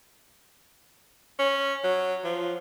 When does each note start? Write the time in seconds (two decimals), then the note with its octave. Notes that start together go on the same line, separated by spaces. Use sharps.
1.39 C#4
1.84 F#3
2.24 F3